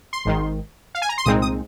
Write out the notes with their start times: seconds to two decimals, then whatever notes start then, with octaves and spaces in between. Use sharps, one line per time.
0.13 C6
0.25 G#1 G#2 D#3
0.95 F5
1.02 G#5
1.09 A#5
1.18 C6
1.25 C2 A#2 G#3 C4 D#4 D#6
1.42 D#6